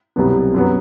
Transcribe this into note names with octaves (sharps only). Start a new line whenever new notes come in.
C2 B2 F#3 B3
F#2 F#3 B3